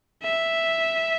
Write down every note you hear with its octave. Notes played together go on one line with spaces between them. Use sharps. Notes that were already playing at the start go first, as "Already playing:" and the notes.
E5